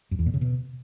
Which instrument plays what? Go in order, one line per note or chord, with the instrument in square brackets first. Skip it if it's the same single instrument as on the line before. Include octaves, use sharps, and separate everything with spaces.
[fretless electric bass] F#2
E2
A#2
C#3
B2